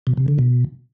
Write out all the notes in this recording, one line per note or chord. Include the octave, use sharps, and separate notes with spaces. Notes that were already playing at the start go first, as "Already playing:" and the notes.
B2
C3
D3
B2